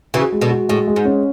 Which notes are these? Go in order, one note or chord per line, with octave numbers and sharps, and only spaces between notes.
C#3 E3 F#4
G#3
B2 D3
F#4
A2 G#3
G#3
G#2
C#4